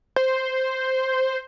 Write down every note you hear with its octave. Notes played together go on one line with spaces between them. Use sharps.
C5